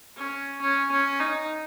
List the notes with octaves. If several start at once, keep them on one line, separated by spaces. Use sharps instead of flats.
C#4
C#4
C#4
D#4